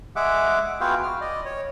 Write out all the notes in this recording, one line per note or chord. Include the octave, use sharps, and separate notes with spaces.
G#3 G#4 E5 F#5 D6
B3 F4 F#4 G#4 F5 G5
F6
D5 D#5
C#5